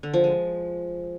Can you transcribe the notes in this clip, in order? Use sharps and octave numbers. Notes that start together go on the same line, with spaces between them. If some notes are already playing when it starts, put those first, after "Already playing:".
D3
F3
G#3